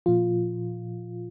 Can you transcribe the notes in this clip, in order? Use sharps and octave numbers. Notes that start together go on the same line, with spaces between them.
A#2 F3 F4